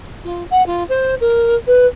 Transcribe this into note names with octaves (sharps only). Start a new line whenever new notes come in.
F4
F#5
F4
C5
A#4
B4